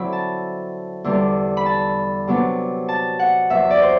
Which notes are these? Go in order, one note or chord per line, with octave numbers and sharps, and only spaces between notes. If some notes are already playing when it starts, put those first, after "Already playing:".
Already playing: D3 F#3 C4 E4 B5
A5
E2 D3 G3
B5
A5
C3 F#3 B3 D4
A5
F#5
E2 C3 F#3 E5
D5
C5